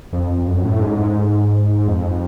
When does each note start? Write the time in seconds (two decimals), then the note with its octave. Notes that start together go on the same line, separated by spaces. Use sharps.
0.13 F2
0.47 F#2
0.65 A2
0.82 G#2
1.88 F2